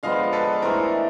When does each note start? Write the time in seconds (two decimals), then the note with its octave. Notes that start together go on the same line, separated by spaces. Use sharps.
0.03 D3 F3 G#3 B3 D#5 F5
0.33 A4 B4
0.62 E3 A3 D4 A#4 C5